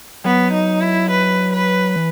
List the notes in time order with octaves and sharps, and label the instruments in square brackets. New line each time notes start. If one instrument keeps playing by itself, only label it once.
[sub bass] F#3 [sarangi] B3
[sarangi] D#4
E4
B4
B4
[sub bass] E3